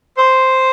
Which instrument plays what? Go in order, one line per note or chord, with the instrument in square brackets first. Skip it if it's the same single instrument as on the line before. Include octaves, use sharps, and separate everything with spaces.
[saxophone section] C5